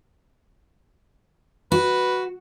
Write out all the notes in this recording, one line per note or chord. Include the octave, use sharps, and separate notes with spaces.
F#4 B4